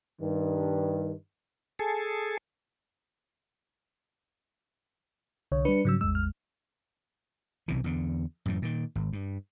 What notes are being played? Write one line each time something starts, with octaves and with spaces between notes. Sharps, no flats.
G2 D#3
G#4 A4
C2 D3 C#5
G3 D4 B4 C#7
G#2 C#3 F#3 E6
A1 E2 G#3 E6
F6
B1 C3 E3
E2 D3
F#2 A2 E3
A#2 D#3
G#1
G2